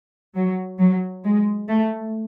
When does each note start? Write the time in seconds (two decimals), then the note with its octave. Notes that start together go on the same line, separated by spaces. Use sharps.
0.35 F#3
0.79 F#3
1.24 G#3
1.68 A3